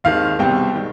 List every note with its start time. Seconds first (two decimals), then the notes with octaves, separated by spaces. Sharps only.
0.04 D#2 D#3 G#3 C4 F5
0.39 C2 B2 G3 C4 G5
0.74 D#3 G#3